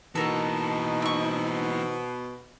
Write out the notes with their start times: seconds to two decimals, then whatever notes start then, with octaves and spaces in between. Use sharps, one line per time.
0.15 B2 E3 A#3 D#4 A4 A#4
1.02 C4 C#6